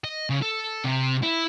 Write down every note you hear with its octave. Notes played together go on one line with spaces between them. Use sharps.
D#5
C#3
A4
C3
E4